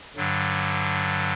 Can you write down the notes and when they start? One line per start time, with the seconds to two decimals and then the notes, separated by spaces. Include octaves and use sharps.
0.16 G2 D3 F#3